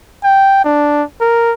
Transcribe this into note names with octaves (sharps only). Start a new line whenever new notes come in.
G5
D4
A#4